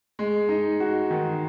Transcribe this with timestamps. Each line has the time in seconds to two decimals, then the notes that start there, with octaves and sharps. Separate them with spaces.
0.19 G#3
0.49 D#4
0.80 F#4
1.11 D#3